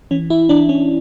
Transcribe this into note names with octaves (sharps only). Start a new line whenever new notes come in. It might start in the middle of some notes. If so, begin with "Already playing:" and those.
E3 C#4
E4
E3 D4
C#4